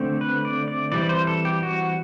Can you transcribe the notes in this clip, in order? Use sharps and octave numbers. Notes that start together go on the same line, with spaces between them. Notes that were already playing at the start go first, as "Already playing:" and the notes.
Already playing: D3 A3 C4
B4
D5
D5
E3 G3 C4 D5
D5
C5
A4
G4
F#4